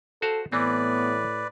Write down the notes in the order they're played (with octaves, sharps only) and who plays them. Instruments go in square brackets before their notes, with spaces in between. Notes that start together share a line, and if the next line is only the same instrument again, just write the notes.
[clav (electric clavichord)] F#4 C5 F5 [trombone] A4
[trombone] A2 [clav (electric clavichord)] E3 C4 [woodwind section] B3 [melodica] B4 D5